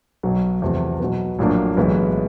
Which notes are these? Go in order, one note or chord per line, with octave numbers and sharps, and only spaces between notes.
B1 B2 F#3
E2 C3 F3 A3
B2 F#3 B3
A#1 A2 F#3 A#3 D4
B1 A2 E3 G#3 B3